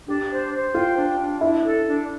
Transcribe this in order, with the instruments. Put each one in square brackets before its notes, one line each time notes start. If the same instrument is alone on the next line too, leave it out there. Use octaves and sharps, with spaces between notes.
[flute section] D4 [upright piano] G4
[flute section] C5
C5
[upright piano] F4 [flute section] G5
[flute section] D4
D4
[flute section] D4 [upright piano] E4
[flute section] A4
D4